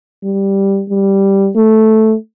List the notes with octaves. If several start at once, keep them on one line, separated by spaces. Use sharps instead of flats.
G3
G3
A3